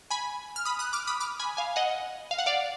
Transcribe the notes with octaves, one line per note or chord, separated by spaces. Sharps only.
G#5 B5
F6
B5 D#6
D#6 F#6
D6 F6
B5 D#6
D6 F6
G#5 B5
F5 G#5
D#5 F#5
F5
F#5
D5 F5